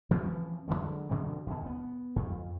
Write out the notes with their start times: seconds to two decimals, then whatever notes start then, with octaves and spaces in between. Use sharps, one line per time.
0.11 E3 F3 C4 C#4
0.68 D3 D#3 F#3 G#3
1.09 B2 D3 F3 C4
1.47 D#2 B2
1.66 B3
2.16 F2